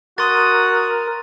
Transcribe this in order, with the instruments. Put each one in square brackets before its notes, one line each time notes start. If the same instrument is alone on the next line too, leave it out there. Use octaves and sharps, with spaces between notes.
[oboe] F#4 [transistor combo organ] A#4 [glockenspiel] C6 A6 [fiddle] D#6